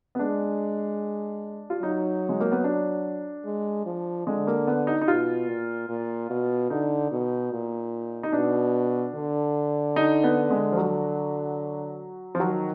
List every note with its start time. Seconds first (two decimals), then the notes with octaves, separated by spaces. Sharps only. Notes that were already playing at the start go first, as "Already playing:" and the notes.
0.15 B3
0.19 G#3 D4
1.70 F4
1.82 F#3 D#4
2.29 G#3
2.40 A#3
2.52 B3
2.64 D4
3.45 G#3
3.85 F3
4.27 D3 G#3
4.47 A#3
4.67 B3
4.87 D#4
5.02 D#4
5.08 B2 F4
5.48 A#2
5.89 A#2
6.30 B2
6.70 D3 D#4
7.11 B2
7.51 A#2
8.23 D#4
8.33 B2 D4
9.15 D3
9.96 D#4
10.23 B3
10.51 G#3
10.72 F3
10.77 F#3
12.35 F3
12.40 D#3 F#3